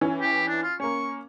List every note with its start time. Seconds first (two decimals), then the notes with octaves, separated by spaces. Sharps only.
0.01 E3 C#4
0.21 G4
0.48 D4
0.63 F4
0.80 A#3 C#4 C#6